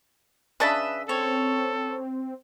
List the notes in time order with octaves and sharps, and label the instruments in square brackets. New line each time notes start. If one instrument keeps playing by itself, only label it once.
[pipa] C#3 D4 A5 [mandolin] B4 D#5 E5
[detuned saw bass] C4 [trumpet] A4 [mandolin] C#5